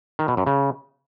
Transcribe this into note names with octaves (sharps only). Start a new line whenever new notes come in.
D#3
B2
F#2
C#3